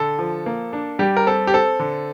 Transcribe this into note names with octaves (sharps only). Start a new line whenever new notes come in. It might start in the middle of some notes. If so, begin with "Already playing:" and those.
Already playing: D3 A4
F3
A#3
D4
G3 G4
A#4
C4 A4
G4
C4 A4
D3